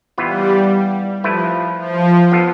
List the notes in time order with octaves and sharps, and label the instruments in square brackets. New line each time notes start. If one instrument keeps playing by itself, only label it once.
[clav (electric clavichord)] E3 B3 F4 B4 [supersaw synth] G3
[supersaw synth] F3 [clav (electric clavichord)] A3 E4 B4
[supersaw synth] F3
[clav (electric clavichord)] F3 B3 F4 A4